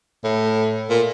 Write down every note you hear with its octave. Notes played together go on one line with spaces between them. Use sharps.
A2
A#2